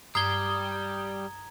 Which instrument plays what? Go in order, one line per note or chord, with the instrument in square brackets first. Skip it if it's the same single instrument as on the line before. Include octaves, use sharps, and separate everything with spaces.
[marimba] G2 [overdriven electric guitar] G3 [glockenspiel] A#5 G#6 [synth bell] D#6 G7